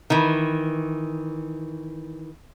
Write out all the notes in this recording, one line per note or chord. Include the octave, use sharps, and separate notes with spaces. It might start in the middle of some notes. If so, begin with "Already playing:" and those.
D#3 E3